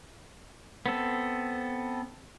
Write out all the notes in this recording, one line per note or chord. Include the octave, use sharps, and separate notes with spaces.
B3 C4 A4